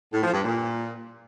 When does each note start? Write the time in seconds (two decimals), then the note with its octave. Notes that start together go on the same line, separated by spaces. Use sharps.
0.13 A2
0.23 F3
0.34 G2
0.44 A#2